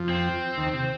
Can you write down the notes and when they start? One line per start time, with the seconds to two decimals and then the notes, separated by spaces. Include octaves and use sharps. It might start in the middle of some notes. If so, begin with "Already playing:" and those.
Already playing: F2 F3
0.09 C4
0.58 D#2 D#3
0.73 C3